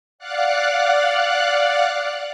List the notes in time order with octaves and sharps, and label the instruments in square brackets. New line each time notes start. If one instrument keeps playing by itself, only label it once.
[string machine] D5 F5 F#5 F#6